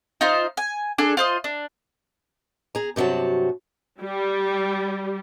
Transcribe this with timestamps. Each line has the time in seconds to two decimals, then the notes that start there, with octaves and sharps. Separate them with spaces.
0.21 D#4 F4 C5
0.57 G#5
0.98 D4 G#4 A4
1.17 F4 C5 D#5
1.44 D4
2.75 G#4 A#5
2.96 G2 C3 F#3 F#4 A5
4.00 G3